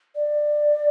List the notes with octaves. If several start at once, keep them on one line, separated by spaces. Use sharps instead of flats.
D5